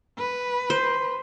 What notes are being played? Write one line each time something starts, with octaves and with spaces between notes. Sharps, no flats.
B4
C5